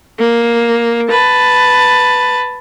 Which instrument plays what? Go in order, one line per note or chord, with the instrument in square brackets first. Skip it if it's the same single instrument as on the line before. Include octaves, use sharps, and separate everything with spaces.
[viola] A#3
B4 A5